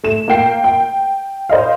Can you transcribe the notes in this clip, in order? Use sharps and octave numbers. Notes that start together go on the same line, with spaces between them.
A3 E7
A#3 A#4 G5 C7
G5
C5 D#5 F5